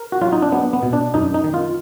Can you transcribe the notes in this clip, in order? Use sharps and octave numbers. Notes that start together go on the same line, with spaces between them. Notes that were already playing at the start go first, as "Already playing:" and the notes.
Already playing: A#4
F#4
F#3 F4
D#4
D4
F#3 B3
B3
B2
D4
F#2 D#4
D#4
D#3
F4